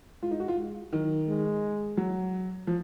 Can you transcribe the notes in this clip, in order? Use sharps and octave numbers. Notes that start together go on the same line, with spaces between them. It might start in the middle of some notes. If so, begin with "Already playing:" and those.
G#3 F4
D#4
F#4
F4
G#3
D#3 F#3
G#3
F#3
F3